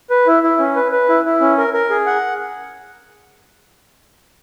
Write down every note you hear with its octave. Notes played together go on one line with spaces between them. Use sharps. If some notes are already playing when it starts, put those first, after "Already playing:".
B4
E4
E4
C#4
B4
B4
E4
E4
C#4
A#4
A#4
G#4
F#5